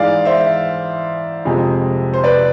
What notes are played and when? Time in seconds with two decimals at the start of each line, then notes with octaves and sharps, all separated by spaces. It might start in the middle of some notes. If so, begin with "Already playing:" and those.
Already playing: G#2 E3 G#3 D5 F5
0.25 C5 E5
1.45 F2 C3 G#3
2.14 C5
2.24 B4 D5